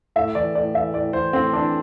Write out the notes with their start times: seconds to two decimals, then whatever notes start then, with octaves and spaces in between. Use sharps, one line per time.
0.16 A2 E5
0.35 E3 D5
0.55 A2 D5
0.74 E3 E5
0.94 A2 D5
1.13 E3 C5
1.33 A2 C4
1.53 E3 D4